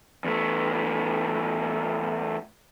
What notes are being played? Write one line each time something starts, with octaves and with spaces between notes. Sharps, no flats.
E2 A3